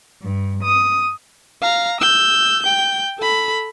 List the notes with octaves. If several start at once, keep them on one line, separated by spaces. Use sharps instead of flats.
G2
D#6
F5 A#5
E6 G6
G5 G6
A4 B5